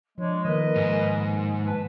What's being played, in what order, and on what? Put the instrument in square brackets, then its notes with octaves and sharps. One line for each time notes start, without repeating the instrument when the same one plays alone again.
[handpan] F3 [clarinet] G#3 [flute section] D4 C#5
[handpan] D#3 A#3 [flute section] A#4 B4 [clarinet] D#5
[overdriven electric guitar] G#2
[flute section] F#5
[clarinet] B4 [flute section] A5